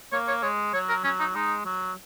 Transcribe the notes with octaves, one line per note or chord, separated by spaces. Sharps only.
A#3 C#5
C#5
G#3 C#5
F#3 C#5
A#4
F#3 C#4
D#4
G#3 D#4
F#3